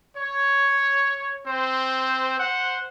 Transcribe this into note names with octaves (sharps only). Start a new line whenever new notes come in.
C#5
C4 C5
C5 F#5